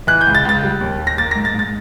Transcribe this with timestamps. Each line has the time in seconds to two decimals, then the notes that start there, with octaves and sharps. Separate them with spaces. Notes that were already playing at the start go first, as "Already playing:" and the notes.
0.07 E3 F#6
0.21 G6
0.26 C#2
0.35 A6
0.45 C#2 A6
0.63 G3
0.81 D#2
0.99 D#2
1.07 A#6
1.18 A#3 A6
1.31 G#2 A#6
1.45 A6
1.54 G#2
1.59 A6